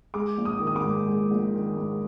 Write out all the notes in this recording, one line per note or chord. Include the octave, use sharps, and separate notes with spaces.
G#3 D6
A#1
D#6
D#3
D#6
D6
G#2
G#3
A#1
D#3
G#2